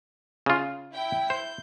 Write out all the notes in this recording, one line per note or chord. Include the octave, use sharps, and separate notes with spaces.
C#3 F4
E4 G5
C5 G6